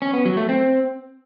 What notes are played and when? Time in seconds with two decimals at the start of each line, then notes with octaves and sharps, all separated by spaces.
0.02 C#4
0.14 B3
0.25 F#3
0.37 A3
0.49 C4